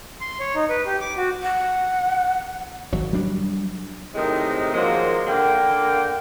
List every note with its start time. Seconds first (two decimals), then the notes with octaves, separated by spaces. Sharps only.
0.21 C6
0.40 C#5
0.55 D#4
0.69 B4
0.86 G4
1.01 D6
1.17 F#4
1.43 F#5
2.93 G#1 F#3
3.13 F#3 G3 D4
4.15 A2 C3 D#3 G#3 C4 D#4
4.74 D#3 F3 F#3 G#3 A#3
5.27 D3 A#3 G5